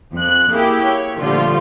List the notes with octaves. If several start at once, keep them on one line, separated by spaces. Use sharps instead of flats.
F2 F#6
A#3 E4 G4 G#4
C#5
A#2 D3 F3 G3 A3 F4